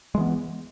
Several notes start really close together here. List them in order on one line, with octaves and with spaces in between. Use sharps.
G#3 E3 B3